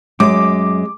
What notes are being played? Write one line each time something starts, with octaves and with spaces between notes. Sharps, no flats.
F#2 G#3 D6